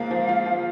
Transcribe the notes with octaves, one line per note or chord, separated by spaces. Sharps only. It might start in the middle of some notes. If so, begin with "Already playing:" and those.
Already playing: G#2 F3 A#3 F5
F3
F4
F3